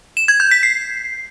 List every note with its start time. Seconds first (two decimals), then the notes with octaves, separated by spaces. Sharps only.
0.17 E7
0.28 G#6
0.40 G6
0.51 B6
0.63 C7